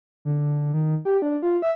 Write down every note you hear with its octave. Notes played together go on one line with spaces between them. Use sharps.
D3
D#3
G4
D4
F4
E5